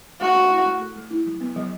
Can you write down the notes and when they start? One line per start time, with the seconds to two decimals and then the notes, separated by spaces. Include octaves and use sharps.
0.21 A3 F#4
0.36 A3
0.51 E4
0.66 A3
0.81 A4
0.96 A3
1.11 E4
1.26 F#3
1.40 B3
1.56 F#3